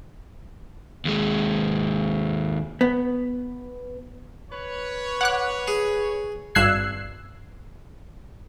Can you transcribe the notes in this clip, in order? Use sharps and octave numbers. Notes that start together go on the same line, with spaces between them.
D#2 G#3
B3
B4 C#5
F#5 D6 F#6
G#4
G#1 G2 E6 F#6 G#6 C7